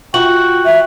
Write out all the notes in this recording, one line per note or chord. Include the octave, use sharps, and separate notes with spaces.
F4 F#4 G5 C#6 F#7
E5